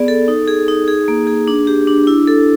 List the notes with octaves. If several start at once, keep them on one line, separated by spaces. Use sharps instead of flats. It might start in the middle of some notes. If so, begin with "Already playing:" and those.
Already playing: B3 G#4 D5
A4
D#4
G#4
D#4
G#4
A#3
G#4
D4
G4
D4
E4
A4